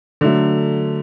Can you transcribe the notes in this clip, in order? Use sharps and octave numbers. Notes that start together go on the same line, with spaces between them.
D3 F#3 A3